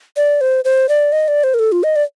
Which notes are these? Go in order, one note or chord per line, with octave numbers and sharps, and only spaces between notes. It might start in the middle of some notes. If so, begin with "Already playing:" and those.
D5
C5
C5
D5
D#5
D5
C5
A#4
A4
F4
D#5
D5